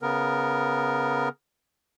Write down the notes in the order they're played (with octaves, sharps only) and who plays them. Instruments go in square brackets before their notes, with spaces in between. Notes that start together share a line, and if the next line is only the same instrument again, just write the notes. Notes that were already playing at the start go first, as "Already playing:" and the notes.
[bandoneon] C#3 B3 A#4